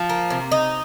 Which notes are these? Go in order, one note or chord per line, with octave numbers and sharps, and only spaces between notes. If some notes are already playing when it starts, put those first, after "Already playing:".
Already playing: F3
A#3
C3
D#4